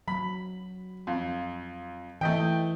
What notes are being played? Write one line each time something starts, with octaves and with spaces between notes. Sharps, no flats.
F#3 B5
F2
E3 A3 D#5 G5